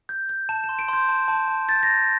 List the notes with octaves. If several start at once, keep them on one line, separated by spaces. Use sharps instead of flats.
G6
G6
A5 E7
E7
C6
D7
C6 G6
A5
A5
A5
G6 A6
A#6
G6